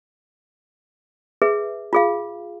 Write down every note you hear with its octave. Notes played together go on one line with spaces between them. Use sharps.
G#4 B4 E5
F4 G#4 F5